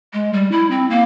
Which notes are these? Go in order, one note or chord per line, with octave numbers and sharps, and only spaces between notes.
G#3
G3
E4
C4
A#3